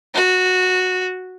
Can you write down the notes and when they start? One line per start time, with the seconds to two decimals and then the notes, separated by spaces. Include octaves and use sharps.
0.15 F#4